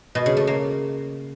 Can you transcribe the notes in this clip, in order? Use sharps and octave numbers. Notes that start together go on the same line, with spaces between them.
B2
C#3
A3
A#3